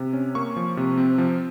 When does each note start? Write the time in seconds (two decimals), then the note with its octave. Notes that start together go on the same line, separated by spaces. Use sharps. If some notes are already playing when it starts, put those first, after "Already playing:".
Already playing: C3
0.13 C#4
0.35 A#3 C#6
0.56 F3
0.77 C3
0.97 C4
1.18 F3